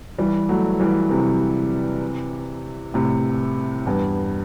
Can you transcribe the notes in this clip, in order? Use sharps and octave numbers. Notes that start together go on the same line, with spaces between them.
E3 G3
F#3 A3
E3 G3
C3 E3
A2 C3
E2 G2